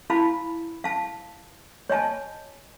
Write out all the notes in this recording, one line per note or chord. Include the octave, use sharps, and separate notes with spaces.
E4 F5 A5 B5
F5 A5
C#5 D#5 G#5 A5